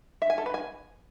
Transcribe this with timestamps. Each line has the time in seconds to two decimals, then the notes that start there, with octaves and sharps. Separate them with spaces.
0.22 E5
0.30 G#5
0.38 A4
0.46 B4
0.54 G#5